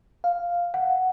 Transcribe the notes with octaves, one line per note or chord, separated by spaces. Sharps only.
F5
F#5